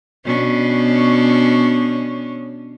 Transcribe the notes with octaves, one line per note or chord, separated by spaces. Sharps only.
B2 C#4 D4